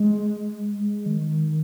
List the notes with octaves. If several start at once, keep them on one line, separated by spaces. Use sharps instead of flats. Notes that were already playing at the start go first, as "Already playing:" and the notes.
Already playing: G#3
G#3
D#3